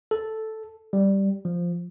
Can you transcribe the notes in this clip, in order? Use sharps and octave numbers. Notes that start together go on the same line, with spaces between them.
A4
G3
F3